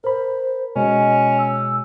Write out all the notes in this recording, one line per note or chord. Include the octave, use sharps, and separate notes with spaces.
A#4 C5 B5
B2 G#3 C#4 D#5
E6